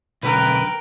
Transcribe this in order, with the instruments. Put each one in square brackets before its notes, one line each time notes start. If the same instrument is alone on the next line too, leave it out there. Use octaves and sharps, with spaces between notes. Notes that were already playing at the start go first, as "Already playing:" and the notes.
[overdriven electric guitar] B1 D3 [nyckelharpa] A#4 G5 [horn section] B4